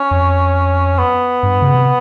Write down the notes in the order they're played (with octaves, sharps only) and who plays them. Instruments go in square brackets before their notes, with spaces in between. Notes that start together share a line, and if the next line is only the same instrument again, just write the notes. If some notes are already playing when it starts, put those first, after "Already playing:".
Already playing: [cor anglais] C#4
[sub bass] F2
[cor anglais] B3
[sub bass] G2
C#3
C3